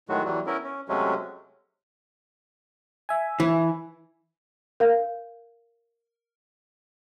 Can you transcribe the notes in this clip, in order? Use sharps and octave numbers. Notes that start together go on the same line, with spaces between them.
A2 D#3 F#3 G#3 F#4
E2 E3 F#3 G3
B3 C#4 E4 A#4
C#4
C3 F#3 G#3 A3 C#4
E5 G#5
E3
A#4 F5